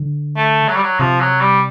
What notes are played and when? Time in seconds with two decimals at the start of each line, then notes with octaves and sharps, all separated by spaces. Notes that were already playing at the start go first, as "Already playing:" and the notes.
Already playing: D3
0.37 A3
0.68 F#3
0.76 G3
0.84 F#3
1.00 C3 F3
1.21 F#3
1.41 G3